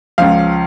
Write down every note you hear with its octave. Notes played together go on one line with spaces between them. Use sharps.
C#2 C#3 F3 F5